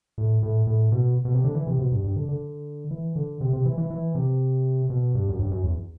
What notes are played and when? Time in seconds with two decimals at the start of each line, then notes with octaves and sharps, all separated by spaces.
0.18 A2
0.43 A2
0.67 A2
0.92 B2
1.25 B2
1.35 C3
1.44 D3
1.55 E3
1.67 C3
1.79 B2
1.92 G2
2.04 G2
2.16 D3
2.29 D3
2.91 E3
3.16 D3
3.41 C3
3.53 C3
3.66 E3
3.78 E3
3.90 E3
4.15 C3
4.90 B2
5.15 G2
5.29 F#2
5.39 G2
5.51 F#2
5.64 E2